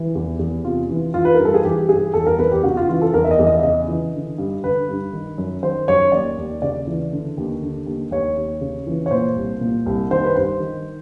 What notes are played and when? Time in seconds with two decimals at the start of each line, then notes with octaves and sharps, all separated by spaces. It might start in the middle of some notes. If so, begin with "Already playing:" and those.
Already playing: E3
0.15 E2
0.39 E2
0.64 C3 F4
0.90 E3
1.14 E3 F4
1.25 B4
1.34 G2 A#4
1.45 A4
1.54 G#4
1.64 E3 G4
1.89 G2 G#4
2.14 E2 A4
2.27 A#4
2.38 E2 B4
2.52 G4
2.63 C#3 F#4
2.77 F4
2.89 E3 F4
3.01 A4
3.14 E2 A#4
3.24 E5
3.31 D#5
3.39 E2
3.47 D#5
3.57 E5
3.63 C#3 D#5
3.88 E3
4.14 D3
4.38 G2
4.64 D3 B4
4.89 G2
5.13 D#3
5.38 F#2
5.63 D#3 C5
5.88 F#2 C#5
6.12 D#2 D5
6.38 D#2
6.62 C#3 D5
6.87 E3
7.13 D3
7.38 D#2
7.62 D3
7.86 D#2
8.11 D#2 C#5
8.37 D#2
8.61 C#3
8.87 E3
9.06 C#5
9.11 A#2 C5
9.36 C2
9.61 A#2
9.86 C2
10.11 D#3 C5
10.24 B4
10.36 G2 C5
10.60 D#3